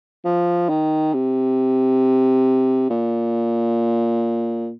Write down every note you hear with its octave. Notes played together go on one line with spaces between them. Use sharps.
F3
D#3
C3
A#2